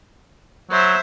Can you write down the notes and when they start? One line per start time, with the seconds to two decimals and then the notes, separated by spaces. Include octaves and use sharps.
0.71 F#3 C5 E5